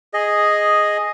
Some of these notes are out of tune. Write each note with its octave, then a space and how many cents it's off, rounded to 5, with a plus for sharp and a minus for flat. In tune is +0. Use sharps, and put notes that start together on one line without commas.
G#4 +0 D#5 +0